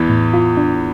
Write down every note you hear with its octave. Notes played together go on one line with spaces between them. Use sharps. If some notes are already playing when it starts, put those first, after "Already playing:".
Already playing: E2 E3
A2
F4
D4